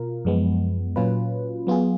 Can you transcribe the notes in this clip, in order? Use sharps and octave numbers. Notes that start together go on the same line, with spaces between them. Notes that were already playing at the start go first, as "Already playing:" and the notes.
Already playing: B2 F4 A#4
F#2 F3 G#3 B3
A#2 F#3 C#4 F4 B4
F#3 B3 F4 G#4